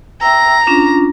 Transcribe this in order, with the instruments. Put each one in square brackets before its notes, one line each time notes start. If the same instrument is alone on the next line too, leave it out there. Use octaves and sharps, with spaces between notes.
[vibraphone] E5 G5 E6 [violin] A#5
[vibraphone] C#4 D4 F4